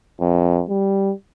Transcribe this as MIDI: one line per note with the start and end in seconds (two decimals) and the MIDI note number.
0.21 0.62 41
0.70 1.12 55